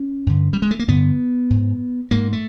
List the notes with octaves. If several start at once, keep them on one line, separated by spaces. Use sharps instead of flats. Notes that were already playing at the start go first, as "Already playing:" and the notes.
Already playing: C#4
G2 D3
G3
G#3
A3
A#3
G2 D3 B3
G#2
G#2 A#3
A3